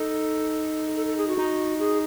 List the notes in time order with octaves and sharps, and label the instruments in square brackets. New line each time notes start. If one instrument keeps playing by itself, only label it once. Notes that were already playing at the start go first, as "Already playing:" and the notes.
Already playing: [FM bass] D#4 [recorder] A4
[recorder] A4
A4
G#4
F#4
[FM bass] D#4
[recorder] G#4